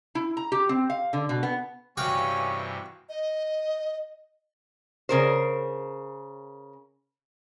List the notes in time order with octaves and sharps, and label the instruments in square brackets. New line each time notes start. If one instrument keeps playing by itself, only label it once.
[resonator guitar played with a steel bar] E4
A#5
G4
C4
F5
D3
B2
B3
[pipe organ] G2 C3 E3 [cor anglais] C#4 [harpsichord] F#4 F5 G5
[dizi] D#5
[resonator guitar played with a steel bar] C#3 A#4 C5